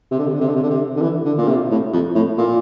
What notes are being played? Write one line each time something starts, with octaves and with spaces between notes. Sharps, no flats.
C3
D3
C3
D3
C3
D3
C3
D3
C3
D3
E3
D3
A#2
C3
A2
F2
A2
A#2